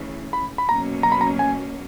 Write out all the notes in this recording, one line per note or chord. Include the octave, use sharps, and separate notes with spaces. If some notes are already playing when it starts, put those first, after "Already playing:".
Already playing: C#3 E3 A3
B5
B5
B2 F#3 A#3 C#4 A#5
A#5
B5
A#5
G#5